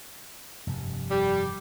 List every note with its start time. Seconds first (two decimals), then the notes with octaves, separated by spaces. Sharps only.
0.67 F1 G2 C3
1.10 G3